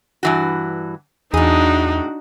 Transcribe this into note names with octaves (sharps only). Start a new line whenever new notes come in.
G2 E3 F#4
E2 A2 D4 D#4 F#4 G#4